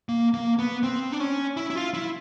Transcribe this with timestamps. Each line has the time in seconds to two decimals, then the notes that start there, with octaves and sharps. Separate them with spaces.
0.09 A#3
0.34 A#3
0.59 B3
0.83 C4
1.12 D4
1.20 C#4
1.57 E4
1.70 E4
1.76 F4
1.94 E4